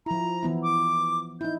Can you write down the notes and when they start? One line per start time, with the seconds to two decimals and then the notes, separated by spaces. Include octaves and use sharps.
0.06 F3 E4 A#5
0.43 E3 B3 E4
0.63 D6
1.41 D#4 E4 G6